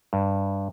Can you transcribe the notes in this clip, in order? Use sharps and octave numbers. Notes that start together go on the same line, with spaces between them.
G2